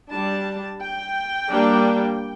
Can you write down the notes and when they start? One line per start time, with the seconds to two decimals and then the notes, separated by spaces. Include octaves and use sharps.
0.11 G3 D4 A5
0.82 G5
1.51 G3 A#3 D4